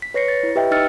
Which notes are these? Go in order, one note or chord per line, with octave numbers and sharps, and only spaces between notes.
B6
B4 C#5 A#6 C7 C#7
A6
E4
G4 B4 D#5 E5 G5
D#4 D#5 E6 F6 A6 C#7